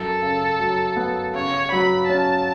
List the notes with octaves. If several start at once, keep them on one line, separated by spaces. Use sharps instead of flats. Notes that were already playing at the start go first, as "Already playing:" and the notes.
Already playing: F#2 A4
C#3
F#3
B3
C#3 C#5
F#3 B5
C#4 A5